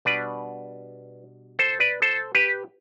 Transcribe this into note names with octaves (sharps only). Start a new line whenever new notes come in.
B2 G3 D4 B4 D5
A4 C5
B4 D5
A4 C5
G4 B4